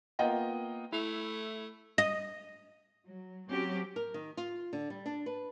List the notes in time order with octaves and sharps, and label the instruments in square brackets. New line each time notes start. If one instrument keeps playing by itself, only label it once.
[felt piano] A#3 B3 F4 D#5 F#5 G5
[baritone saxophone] A3 [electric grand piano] E4
[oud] D#5
[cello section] F#3
F#3 C4 C#4 F#4 G4
[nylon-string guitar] A#4
D#3
F4
D3
G3
D4
B4